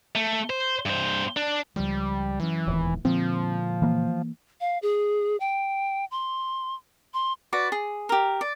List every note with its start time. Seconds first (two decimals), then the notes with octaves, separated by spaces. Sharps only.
0.15 A3
0.50 C5
0.86 G2 C5
1.37 D4
1.76 C#2 F3 G3
2.40 E3 F#3 C#4
2.67 D#1 G#1 E2
3.05 A#2 D3 F3 G#3 C4
3.82 E3 A#3
4.61 F5
4.82 G#4
5.40 G5
6.11 C6
7.14 C6
7.53 F#4 B4 D5
7.72 G#4
8.09 G4 A#4
8.41 D5